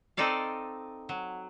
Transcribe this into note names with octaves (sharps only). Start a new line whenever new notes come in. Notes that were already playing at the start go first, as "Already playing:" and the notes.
C4 D#4 A4 D5 F5
F#3